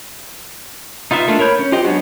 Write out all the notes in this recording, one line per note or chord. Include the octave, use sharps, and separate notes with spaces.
D#4 F4 B4 E5
A3 A#3 D4 F4 A4
A#4 C#5 B5 G6
C#4
F4 G4 C5 D#5
F#3 G#3 B3 D4 F#4